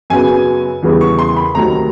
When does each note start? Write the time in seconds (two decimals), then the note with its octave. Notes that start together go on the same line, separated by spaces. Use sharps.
0.10 F#2 C#3 F#3 B3 G#5
0.82 E2 C#3 E3 G3 B3
1.01 C#6
1.19 C6
1.37 B5
1.55 D2 C3 D#3 F#3 A3 A#5